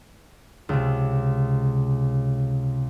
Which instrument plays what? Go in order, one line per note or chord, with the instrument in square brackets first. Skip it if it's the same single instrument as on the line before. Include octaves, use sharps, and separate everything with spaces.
[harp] C#2 C3